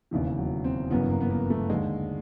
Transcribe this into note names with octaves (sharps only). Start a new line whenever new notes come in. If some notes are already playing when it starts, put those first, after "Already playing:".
E1 D#2 C#3 E3
F#3
C4
G1 F#2 C#3 E3 B3
A#3
B3
A#3
A3
D#2 D3 G#3